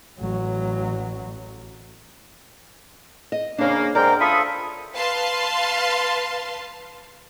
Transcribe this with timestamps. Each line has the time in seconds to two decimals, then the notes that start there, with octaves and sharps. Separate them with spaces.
0.20 A1 F#3
3.32 D#5
3.58 C#3 A#3 D4 C5
3.95 G#2 A#4 D5 G5
4.20 F4 A4 C#5 E5 B5 D#6
4.95 B4 F5 A5 C6